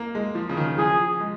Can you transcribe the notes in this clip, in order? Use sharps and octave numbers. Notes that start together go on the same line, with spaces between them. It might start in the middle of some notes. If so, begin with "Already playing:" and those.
Already playing: A#3
G#3
F3
C#3
D#3
F3 G#4
G#3